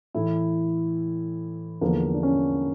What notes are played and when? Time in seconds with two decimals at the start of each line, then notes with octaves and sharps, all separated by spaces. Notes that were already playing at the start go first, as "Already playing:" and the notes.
0.14 A2 E3 E4
1.81 E2 D3 F3 A#3
2.14 D4
2.23 C#4